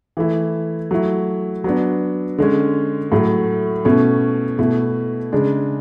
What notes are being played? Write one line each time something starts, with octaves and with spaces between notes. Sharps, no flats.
E3 A3 E4
F#3 A3 E4
F#3 B3 D4
D3 G#3 C#4
A2 F#3 A3
B2 A3 C#4 E4
B2 A3 E4
C#3 G#3 D4